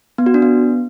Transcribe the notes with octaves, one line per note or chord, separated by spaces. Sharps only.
B3
F#4
D4
B3